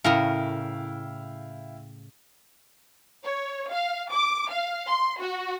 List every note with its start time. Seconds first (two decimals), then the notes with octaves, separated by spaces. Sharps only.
0.04 A2 C#3 E4 A#4 F5 G5
3.23 C#5
3.71 F5
4.11 D6
4.50 F5
4.88 C6
5.20 F#4